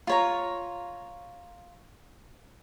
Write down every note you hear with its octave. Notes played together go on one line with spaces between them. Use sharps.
F4 C#5 A#5